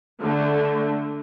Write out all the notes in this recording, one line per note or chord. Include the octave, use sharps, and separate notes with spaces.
D3 A3